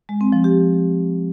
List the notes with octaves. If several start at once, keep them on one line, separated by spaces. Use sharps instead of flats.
G#3
C4
F3
G4